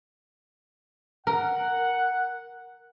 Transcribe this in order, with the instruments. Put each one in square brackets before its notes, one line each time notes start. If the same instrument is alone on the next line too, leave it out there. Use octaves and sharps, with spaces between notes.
[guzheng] A#4 [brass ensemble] F#5